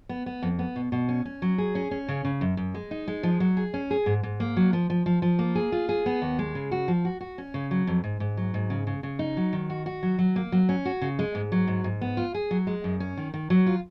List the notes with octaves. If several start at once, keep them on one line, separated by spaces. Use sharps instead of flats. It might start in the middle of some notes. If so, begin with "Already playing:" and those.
B3
B3
F2
B3
B2
B2
C#4
C#4
F#3
G#4
C#4
C#4
C#3
C#3
F#2
F#2
G#3
D#4
G#3
F3
F#3
G#4
C#4
G#4
G#2
G#2
A#3
F#3
F3
F3
F3
F3
A#3
G#4
F4
G#4
B3
D#2
G#3
C#3
F#4
F3
F#4
F#4
C#4
C#3
F#3
F2
G#2
G#2
F#3
G#2
C#3
C#3
C#3
D#4
F#3
D#3
F#4
F#4
F#3
F#3
A#3
F#3
C#4
F#4
C#3
G#3
G#2
F#3
G#2
G#2
B3
F4
G#4
F#3
G#3
F#2
C#4
D#3
D#3
F#3
F4